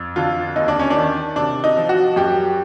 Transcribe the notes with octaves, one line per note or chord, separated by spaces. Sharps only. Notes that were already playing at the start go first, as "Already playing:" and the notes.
Already playing: F2
D3 F4
D#2 D#4
D4
C#4
D4
D#3
C3 D4
D#4
F3
F#4
F#2 G4